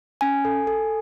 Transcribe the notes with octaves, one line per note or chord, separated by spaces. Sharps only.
C#4 G#5
A4
A4